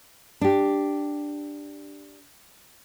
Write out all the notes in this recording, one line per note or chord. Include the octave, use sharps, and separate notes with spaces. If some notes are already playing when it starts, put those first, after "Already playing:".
D4 G4